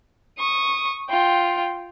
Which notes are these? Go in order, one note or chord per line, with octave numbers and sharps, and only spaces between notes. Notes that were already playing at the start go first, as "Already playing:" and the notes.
C#6 D#6
F4 G5